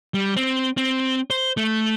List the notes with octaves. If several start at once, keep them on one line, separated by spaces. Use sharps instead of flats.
G3
C4
C4
C5
A3